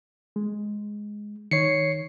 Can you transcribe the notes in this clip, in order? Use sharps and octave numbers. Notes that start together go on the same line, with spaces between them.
G#3
D#3 C#5 C7 C#7